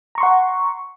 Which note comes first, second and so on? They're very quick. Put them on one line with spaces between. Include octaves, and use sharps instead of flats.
A#5 C#6 C6 F#5